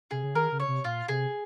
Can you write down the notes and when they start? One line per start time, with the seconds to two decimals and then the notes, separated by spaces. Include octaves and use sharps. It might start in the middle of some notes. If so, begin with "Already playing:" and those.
0.11 C3 G#4
0.24 C#3
0.35 D#3 A#4
0.52 C#3
0.60 C#5
0.68 C3
0.84 A#2 F4
1.08 C3 G#4